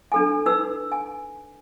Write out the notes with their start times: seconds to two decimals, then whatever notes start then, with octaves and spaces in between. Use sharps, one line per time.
0.12 D4 A4 G#5
0.46 D#4 B4 E6
0.92 G#5